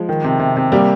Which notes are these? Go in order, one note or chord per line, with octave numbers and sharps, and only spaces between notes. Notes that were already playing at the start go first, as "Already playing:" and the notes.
Already playing: F3 G#3
D#3
C3
C3
C3
G3 A#3 G4